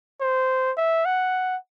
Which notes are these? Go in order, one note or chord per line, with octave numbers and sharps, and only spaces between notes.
C5
E5
F#5